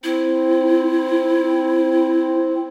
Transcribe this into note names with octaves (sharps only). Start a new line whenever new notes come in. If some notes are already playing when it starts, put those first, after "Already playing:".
C4 E4